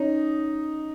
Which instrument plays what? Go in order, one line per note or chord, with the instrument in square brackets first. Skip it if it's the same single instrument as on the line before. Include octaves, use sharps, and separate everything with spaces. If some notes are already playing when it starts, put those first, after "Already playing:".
Already playing: [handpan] C#4 [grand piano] D#4